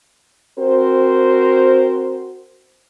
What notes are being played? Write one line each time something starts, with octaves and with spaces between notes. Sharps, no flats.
C4 F#4 A#4 C5